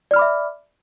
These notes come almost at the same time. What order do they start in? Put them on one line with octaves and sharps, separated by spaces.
D5 F6 B5 D6 E5